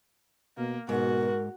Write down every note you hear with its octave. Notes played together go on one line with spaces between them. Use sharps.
B2 A#3
G#2 B2 F#4 A#4